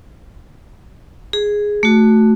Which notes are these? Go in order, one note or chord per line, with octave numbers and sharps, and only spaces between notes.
G#4
A3 F#4